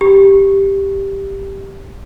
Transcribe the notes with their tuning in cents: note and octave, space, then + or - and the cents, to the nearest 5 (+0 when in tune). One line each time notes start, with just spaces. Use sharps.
G4 +0